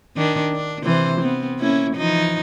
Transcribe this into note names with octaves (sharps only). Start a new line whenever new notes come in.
D#3 D4
D4
C3 E3 C5
B3 C4
A#3 C#4 E4
E3 F3 D#4